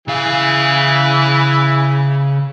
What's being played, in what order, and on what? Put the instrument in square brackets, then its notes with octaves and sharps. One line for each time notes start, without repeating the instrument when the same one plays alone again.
[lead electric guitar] C#3 F5 [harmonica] E3 E4 G#4